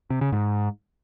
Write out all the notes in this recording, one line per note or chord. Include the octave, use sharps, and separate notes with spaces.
C3
C#3
G#2